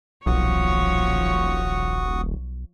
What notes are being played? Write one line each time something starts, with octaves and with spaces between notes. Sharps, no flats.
D#1 B1 F3 F#4 C#5 C#6 D#6